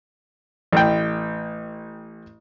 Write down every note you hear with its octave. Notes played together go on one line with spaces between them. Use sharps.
A1 G5